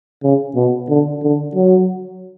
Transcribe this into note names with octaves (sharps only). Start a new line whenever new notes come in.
C#3
B2
D3
D3
F#3